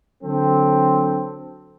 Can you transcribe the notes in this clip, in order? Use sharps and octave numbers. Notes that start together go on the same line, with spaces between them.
D3 F#3 C4 A4